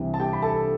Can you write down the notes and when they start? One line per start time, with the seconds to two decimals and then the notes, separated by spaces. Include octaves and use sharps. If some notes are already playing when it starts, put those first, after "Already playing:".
Already playing: C2 C3 E3
0.14 A5
0.20 G4 G5
0.33 B5
0.42 A4 A5